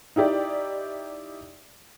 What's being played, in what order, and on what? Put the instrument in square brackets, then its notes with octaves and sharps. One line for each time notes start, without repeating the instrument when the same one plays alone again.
[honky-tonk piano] D#4 E4 G4 D5